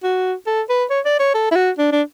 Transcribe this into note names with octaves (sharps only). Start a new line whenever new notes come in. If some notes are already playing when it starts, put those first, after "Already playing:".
F#4
A4
B4
C#5
D5
C#5
A4
E4
F#4
D4
D4